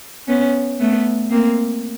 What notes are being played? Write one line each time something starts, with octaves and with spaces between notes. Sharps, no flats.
B3 C#4
A3 B3
A#3 C4